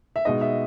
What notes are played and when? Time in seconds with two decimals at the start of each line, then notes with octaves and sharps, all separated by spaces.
0.16 E5
0.25 B2 G#3 D#4 D#5
0.41 E5